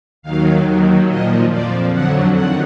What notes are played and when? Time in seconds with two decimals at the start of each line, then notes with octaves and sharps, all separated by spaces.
0.22 D#2 D#3 F#3 F5
0.64 D#2 D#3 F#3
1.07 A#2 F3 D#5
1.49 F2 F3 D5
1.91 F2 D3 F#3 F#5
2.33 F2 D#3 F#5